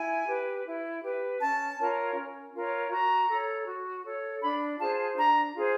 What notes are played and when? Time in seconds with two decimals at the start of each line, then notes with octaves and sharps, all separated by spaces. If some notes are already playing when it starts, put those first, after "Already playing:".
Already playing: E4 G#5
0.28 G4 B4
0.66 E4
1.03 G4 B4
1.41 C#4 A5
1.79 F4 A#4 C#5
2.16 C#4
2.55 F4 A#4 C#5
2.91 F#4 A#5
3.30 A4 C#5
3.67 F#4
4.06 A4 C#5
4.43 D4 B5
4.80 F4 G#4 C5 A5
5.17 D4 A#5
5.55 F4 G#4 C5